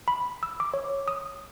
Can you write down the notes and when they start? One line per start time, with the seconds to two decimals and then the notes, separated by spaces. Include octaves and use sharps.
0.08 B5
0.43 E6
0.60 D6
0.74 C#5
1.08 D#6